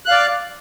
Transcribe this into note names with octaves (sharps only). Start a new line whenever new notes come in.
D5 F5 F#6